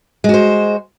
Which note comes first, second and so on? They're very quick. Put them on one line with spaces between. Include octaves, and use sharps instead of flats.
G#3 F#4 C5